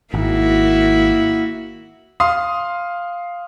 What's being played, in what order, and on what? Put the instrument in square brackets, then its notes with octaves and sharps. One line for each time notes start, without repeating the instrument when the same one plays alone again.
[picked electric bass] G#1 [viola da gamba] A#3 E4 F#4
[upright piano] F5 C6 D#6